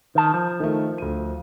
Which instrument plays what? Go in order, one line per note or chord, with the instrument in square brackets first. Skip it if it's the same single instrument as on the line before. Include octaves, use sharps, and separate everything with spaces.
[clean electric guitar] D#3 A5
F3
[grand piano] D#3 A3
D2 D#7